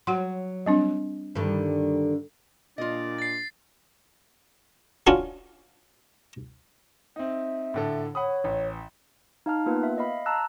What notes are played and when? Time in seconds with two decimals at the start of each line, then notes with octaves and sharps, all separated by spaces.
0.07 F#3 F#4 F#5 C6
0.66 G3 C4 D4
1.35 G2 D3 D#3
2.78 A#2 D4 F4 D5 D#5
3.18 A6 C7
5.07 C#4 D4 F4 F#4
7.16 C4 D#4 E5
7.74 A2 D3 A4
8.15 C#5 F#5 B5 D#6
8.44 A1
9.46 D#4 F5 A5 F6
9.66 A#3 B3 F4 B4
9.83 E5
9.98 D#5 F5 B5
10.26 A5 A#5 E6 F#6